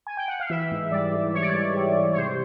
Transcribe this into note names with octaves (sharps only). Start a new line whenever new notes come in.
G#5
G5
F#5
F5
E3 E5
G#2
G3 D5
G#2
E3 C#5
D5
G#2 C#5
G3
G#2
C#5
C3 C5